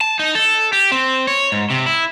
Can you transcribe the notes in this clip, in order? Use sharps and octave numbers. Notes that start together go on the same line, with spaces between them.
A5
D#4
A4
G4
C4
C#5
G#2
C3
E4